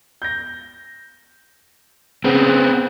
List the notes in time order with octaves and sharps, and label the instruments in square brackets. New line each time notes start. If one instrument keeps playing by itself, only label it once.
[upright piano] G6 A#6
[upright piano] C#3 [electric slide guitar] B3 C4